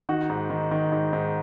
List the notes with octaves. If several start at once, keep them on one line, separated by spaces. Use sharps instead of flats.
D#3 D#4 F#4
G#2
D#3
D#3
G#2
G#2